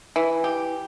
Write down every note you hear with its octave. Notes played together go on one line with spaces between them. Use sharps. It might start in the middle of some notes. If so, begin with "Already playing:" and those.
E3
G4